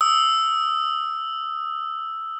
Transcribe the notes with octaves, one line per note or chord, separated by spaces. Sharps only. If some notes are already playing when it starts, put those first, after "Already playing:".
D#6 E6